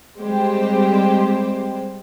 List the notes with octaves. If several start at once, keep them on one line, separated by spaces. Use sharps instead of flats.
G3 G#3 C4 G4 C5